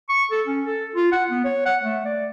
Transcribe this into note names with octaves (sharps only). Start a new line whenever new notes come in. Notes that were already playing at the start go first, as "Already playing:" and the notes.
C#6
A4
C#4
A4
F4
F#5
B3
C#5
F#5
A3
D5